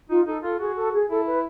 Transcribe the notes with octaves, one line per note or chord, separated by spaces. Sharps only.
D#4 F4
D#4 A4
F4 A4
F#4 G#4
A4
G#4
E4 A4
B4